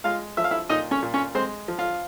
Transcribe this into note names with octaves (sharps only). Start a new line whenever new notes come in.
G#3 F4 F5
F3 E5
F5
E4 E5
A#2 D#4 D#5
C#4 C#5
A#2
C#4 C#5
G#3 C4 C5
F3
F4